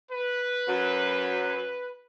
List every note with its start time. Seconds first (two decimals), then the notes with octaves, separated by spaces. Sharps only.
0.12 B4
0.68 F#2 F#3